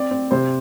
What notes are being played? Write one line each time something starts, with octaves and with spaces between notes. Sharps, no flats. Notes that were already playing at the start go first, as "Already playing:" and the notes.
Already playing: C4 D5
C4
C3 C5